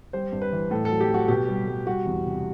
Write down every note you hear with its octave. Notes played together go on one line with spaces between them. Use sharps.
G3 C5
G2
B4
E3
A2 A4
A4
F#3
G4
F#3
F#4
B2 G4
G3
G3
G3 F#4
E2
C3